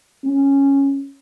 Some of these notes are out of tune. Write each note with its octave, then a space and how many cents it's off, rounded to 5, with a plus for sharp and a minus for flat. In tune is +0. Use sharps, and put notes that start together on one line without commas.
C#4 -5